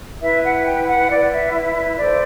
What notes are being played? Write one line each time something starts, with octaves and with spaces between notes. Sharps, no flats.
E4 B4 E5
F#5
G5
F#5
E4 B4 D5
E5
E5
E5
E4 A4 C5 D5